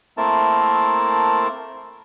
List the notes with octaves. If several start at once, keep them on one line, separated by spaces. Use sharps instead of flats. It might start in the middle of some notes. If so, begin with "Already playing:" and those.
A3 A#3 C4 E4 A#4 A5